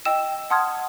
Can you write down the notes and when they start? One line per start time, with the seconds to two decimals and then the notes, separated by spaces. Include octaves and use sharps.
0.05 D#5 G5 E6 E7
0.50 F#5 A5 C6 D#6 F6 G#6